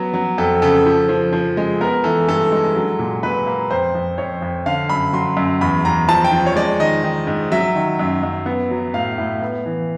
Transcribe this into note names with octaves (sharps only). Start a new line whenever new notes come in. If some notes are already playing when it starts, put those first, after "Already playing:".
Already playing: F#3 B3
F#3
F2 A4
C#3 A4
F3
F3
F3
G#3
B3 A#4
E3 A4
G2 A4
G#3
F#3
A#2
A#2 B4
A#3
F2 C5
F2
F2 C#5
F2
D3 F5
F#2 B5
F#3 C6
F#2
E2 B5
E2 A#5
F3 A5
G5
F3
C#5
G#3 D5
D#3 D#5
D#3
G#2
F#3 E5
D#3
F#2
F#2
B3
F#3
A2 F5
A2
B3
E3